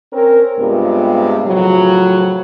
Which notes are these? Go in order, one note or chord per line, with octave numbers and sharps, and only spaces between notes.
C4 C#4 A#4
G2 C3 G#3 B3 F4
A2 C#3 F3 F#3